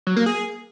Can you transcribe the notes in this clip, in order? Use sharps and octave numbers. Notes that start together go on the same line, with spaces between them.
F#3
A#3
G#4